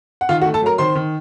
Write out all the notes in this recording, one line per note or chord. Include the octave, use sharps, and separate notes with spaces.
F#5
D#3 F4 F5
F#4 F#5
A3
A4 A5
F#3 A#4 A#5
D#3 C5 C6
D#3